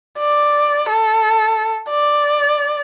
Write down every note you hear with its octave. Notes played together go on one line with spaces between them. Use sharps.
D5
A4
D5